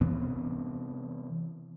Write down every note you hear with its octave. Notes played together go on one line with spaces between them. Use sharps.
C3 E3 B3 C4